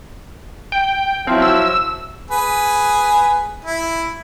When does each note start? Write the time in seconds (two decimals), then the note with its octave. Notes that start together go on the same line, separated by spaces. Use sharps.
0.72 G5
1.27 F3 F#3 C4 E4
1.42 E6
2.31 G#4 B4
3.65 E4